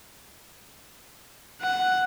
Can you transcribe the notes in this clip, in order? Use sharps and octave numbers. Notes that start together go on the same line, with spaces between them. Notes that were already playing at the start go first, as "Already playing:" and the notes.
F#5